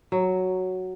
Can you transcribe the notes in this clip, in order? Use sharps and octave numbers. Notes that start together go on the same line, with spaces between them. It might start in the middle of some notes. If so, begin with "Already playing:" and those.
F#3